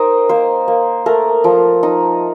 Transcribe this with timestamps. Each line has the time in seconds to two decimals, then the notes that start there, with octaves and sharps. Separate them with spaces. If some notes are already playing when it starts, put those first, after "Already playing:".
Already playing: D#4 A#4 C5 D#5 G5
0.29 A#3 C5
0.68 A#3
1.06 A3 A#4
1.44 F3
1.83 D#4